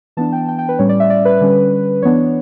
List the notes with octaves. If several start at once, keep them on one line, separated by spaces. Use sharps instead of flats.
E3 B3 D4 A5
G5
G5
G5
B4
A2 G3 C#4 C#5
D5
E5
D5
B4
D3 G3 C#4
E3 B3 D4 C#5